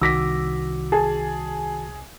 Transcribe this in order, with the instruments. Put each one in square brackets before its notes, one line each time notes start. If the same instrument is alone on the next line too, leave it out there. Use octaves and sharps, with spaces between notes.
[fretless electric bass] C2 [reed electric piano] D#3 F#4 D6 [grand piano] E6 A#6 B6
[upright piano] G#4 [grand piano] A5